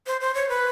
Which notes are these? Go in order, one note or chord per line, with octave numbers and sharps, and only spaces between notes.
C5
C5
C#5
B4